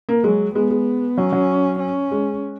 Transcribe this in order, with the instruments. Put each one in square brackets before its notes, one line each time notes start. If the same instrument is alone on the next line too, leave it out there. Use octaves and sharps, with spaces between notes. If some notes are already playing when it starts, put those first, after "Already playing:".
[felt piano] A#3
[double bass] F#3 [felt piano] G#3
[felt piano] G#3 [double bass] B3
[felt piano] G#3
[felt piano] F#3 [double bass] C#4
[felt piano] F#3
[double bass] C#4
[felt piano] G#3